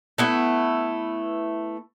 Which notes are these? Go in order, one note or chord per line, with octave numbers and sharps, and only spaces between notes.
A3 B3 E4